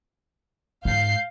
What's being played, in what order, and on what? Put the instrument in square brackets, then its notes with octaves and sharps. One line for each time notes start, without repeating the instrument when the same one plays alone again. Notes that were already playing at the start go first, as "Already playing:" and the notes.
[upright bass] G#2 [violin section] F5 G6 C7